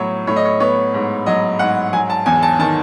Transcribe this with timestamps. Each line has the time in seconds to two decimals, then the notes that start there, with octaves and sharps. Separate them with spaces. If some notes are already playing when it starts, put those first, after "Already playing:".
Already playing: A2 F#3 B3 C#5
0.27 A2 C#5
0.36 D#5
0.45 C#5
0.60 B3 C#5
0.94 G#2
1.26 F#3 D#5
1.59 G#2 F#5
1.93 F#3 G#5
2.10 A5
2.26 E2 G#5
2.43 A5
2.59 D#3 A5